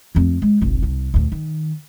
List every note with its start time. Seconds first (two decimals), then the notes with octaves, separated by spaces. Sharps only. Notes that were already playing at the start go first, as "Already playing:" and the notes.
0.15 F2 A3
0.42 G#3
0.61 F1 A#1
0.82 C2
1.14 D2 A2
1.32 D#3